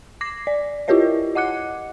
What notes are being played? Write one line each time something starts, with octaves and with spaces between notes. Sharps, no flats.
D6 A#6 C7
D5
E4 F4 G4 A#4 C#5 D#5
D#5 F#5 D6 F#6 C#7